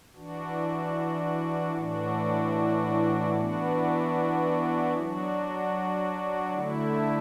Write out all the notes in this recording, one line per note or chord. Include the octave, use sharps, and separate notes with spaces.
E3 D4 F#4
A2 E3 D4 F#4
E3 B3 D4 F#4
F#3 D4 F#4
D3 A3 E4